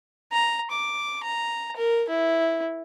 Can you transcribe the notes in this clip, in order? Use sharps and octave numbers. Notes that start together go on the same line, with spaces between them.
A#5
D6
A#5
A#4
E4